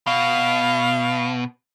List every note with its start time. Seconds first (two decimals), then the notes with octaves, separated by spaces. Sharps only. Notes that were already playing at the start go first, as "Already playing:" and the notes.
0.07 B2 F5